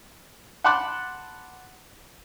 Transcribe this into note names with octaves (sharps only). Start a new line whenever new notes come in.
F#5 A5 B5 C6 D6 F#6